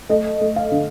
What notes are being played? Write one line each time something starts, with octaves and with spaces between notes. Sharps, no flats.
A3 D#5
A3
F5
D3